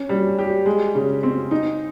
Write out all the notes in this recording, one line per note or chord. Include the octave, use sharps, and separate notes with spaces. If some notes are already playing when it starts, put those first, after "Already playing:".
Already playing: C#4
G3
G4
G#3
C#3
C4
D#4